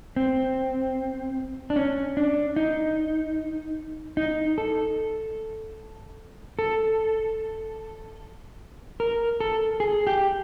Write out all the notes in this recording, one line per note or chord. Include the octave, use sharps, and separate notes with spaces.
C4
D4
C#4
D4
D#4
D#4
A4
A4
A#4
A4
G#4
G4